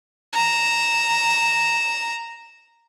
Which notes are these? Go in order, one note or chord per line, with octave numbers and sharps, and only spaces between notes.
A#5 E7